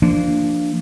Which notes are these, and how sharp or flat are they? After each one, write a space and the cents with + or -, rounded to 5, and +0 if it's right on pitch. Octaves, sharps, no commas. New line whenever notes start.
F3 -20 A#3 -15 D4 +0